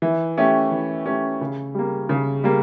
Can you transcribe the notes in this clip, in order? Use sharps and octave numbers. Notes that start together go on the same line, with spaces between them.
E3
A3 C#4 G4
E3
A3 C#4 G4
C#3
G3 A#3
C#3
G3 A#3